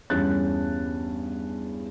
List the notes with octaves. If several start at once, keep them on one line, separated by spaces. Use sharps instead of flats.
E2 G2 C#4 F#6 A6